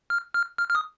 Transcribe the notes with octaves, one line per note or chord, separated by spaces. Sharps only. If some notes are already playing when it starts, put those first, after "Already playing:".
F6
F6
F6
F6
D#6